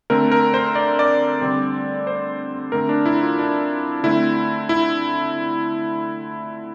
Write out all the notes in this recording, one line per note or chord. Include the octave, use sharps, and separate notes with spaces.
D3 A3 C4 A#4
A#4
C5
D5
D5
D3 G3 C4
C5
D3 A3 C4 A#4
D4
E4
F4
D4
D3 A3 C4 E4
E4